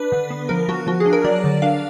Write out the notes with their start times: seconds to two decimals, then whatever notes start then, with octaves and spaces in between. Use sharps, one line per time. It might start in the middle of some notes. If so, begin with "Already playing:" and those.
Already playing: D4 B4
0.12 D3
0.30 B3
0.49 F3 A#4
0.68 F3 F#4
0.87 F3 F#4
1.00 G#4
1.06 D4
1.13 A#4
1.24 F#3 D5
1.44 D3
1.62 D4 F5